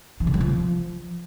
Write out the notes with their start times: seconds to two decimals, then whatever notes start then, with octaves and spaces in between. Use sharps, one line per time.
0.20 E3
0.27 C#3
0.34 G3
0.41 F3